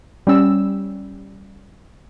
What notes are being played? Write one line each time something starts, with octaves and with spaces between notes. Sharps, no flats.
G3 C#4 E6